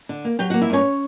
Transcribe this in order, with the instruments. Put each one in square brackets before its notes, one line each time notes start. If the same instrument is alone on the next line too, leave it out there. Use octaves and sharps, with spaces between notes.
[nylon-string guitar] D3
A#3
F#3 G4 G5
A#3 F#4 F#5
E4 E5
G2 C#4 C#5